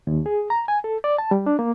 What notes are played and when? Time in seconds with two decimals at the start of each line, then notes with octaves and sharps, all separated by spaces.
0.07 D#2
0.26 G#4
0.50 A#5
0.68 G#5
0.84 A4
1.04 D5
1.18 A5
1.31 G3
1.46 D4
1.59 A#3